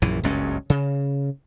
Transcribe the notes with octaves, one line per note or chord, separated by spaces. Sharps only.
A#1 F#2 E3
F#1 C#2 G2 C#4
C#3